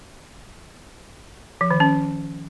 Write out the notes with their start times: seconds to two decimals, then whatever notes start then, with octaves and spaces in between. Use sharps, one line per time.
1.61 F3
1.71 D#3
1.80 C#4